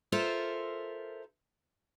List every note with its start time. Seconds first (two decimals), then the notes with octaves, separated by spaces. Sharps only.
0.12 F4 A4 A#4 C5 E5